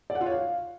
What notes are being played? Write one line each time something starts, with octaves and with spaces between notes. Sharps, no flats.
D5
F#5
F4
C#5
F5